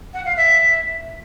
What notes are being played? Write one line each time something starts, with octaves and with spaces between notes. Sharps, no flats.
F#5
F5
E5